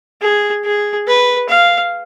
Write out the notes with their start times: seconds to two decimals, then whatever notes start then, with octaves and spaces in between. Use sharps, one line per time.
0.21 G#4
0.65 G#4
1.07 B4
1.49 F5